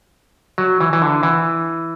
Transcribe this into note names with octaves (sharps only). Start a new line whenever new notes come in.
F#3
E3
E3
D3
E3